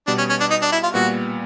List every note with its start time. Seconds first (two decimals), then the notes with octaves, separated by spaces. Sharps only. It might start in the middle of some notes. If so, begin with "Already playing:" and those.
0.07 B2 G3 B3 D4
0.18 C#4
0.30 C#4
0.40 D4
0.51 D#4
0.62 D4
0.72 E4
0.83 F4
0.94 A#2 G3 B3 F#4